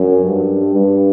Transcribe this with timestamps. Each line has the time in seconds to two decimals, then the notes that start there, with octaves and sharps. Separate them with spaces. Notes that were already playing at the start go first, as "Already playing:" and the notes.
Already playing: F#2
0.25 G2
0.75 G2